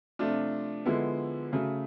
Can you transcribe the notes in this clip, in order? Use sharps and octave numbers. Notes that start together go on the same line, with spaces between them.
C3 F3 A3 D4 F4
D3 F3 G#3 B3 E4
C#3 F#3 A3